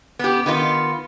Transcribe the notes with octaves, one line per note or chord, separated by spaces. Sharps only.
B3 G4
D#3 B3 F4